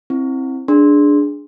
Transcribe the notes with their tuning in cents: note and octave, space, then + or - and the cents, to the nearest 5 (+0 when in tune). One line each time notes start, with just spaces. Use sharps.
C4 +20 E4 +0
D4 +0 G#4 +0 C6 +0